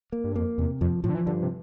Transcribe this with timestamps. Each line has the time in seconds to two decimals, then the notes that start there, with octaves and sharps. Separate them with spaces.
0.12 A#3
0.24 G2
0.36 F2 A#3
0.58 E2 C3
0.81 F2 F3
1.04 A2 F3
1.10 D3
1.15 E3
1.26 G2 D3
1.42 C3